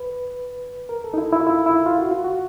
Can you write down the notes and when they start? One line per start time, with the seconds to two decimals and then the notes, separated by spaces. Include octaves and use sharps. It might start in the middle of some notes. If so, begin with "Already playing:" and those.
Already playing: B4
0.89 A#4
1.04 A4
1.14 D#4
1.18 E4
1.33 E4
1.40 F4
1.47 E4
1.66 E4
1.86 F4
1.98 F#4
2.11 F4
2.24 F#4